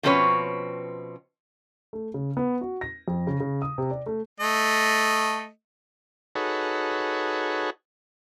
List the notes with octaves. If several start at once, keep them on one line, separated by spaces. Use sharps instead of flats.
B2 F3 C4 C#4 B4 C#5
A3
C#3
B3
F#4
A#6
F2
C#3
C#3
D#6
C3
D5
A3
A3 D#5
D#4 F#4 G#4 A4 B4 C#5